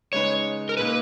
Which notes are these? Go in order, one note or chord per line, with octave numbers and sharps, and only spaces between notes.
C#3 G#3 D#4 G#4 B4 C#5
A#4
A#2 A#3 D#4 B4